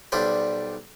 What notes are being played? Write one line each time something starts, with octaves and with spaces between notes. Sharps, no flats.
B1 G3 D4 C5 B5